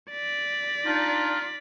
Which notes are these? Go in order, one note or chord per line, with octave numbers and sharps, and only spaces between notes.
D5 B6
D4 D#4 F4